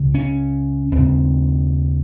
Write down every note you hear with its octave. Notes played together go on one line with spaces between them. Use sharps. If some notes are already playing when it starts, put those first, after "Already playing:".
Already playing: C#2 C#3
C#4
D#2 C#3 C4